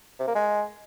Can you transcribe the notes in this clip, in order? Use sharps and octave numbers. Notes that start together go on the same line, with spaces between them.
C3
A#3
G#3